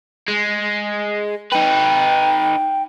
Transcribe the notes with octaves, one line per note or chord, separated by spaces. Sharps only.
G#3
D#4 B4 G5